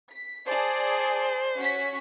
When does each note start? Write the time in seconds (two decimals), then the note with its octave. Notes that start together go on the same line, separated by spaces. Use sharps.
0.10 B6
0.48 G#4 C5 D5 A5
1.58 C#4 F#4 B6